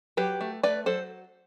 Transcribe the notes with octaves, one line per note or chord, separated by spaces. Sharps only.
F#3 G4 B4
A3
A3 B4 D5
F#3 A4 C5